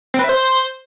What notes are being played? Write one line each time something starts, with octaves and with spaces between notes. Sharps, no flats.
C4
B4
E5
C5